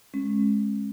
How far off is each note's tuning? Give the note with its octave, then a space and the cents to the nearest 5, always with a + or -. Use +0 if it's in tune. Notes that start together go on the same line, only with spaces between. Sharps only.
G#3 +15 C#4 -30